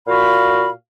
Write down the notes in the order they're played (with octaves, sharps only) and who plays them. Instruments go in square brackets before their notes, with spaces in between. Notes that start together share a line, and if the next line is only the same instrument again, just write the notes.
[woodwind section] A#2 F#4 F5 B5